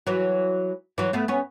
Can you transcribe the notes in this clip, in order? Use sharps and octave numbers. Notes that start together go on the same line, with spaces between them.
E3 F#3
E3 F#3
A3 B3
B3 C#4